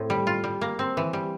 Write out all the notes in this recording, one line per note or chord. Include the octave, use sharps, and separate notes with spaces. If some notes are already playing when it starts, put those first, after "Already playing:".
Already playing: A2 C4
G3
F4
G3
A#3
C4
E3
G3